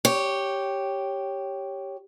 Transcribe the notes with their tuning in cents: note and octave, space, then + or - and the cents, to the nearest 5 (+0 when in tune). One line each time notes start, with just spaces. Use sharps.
G4 +0 C#5 +0